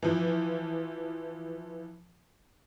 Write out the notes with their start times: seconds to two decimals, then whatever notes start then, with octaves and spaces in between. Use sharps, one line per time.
0.03 E3 F3